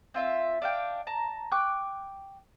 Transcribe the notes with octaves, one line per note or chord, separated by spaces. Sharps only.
C4 F4 E5
D4 F5 G5
A5 A#5
G5 C#6 D6 F#6